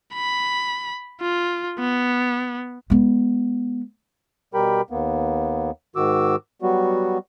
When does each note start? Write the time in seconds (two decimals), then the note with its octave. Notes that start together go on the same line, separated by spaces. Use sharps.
0.14 B5
1.21 F4
1.79 B3
2.90 G#3 B3
4.54 B2 G3 G4 A#4 G5 B5
4.90 D#2 A#3 B3
5.96 G#2 D#3 F#4 D6 E6
6.62 F#3 G3 B3 F#4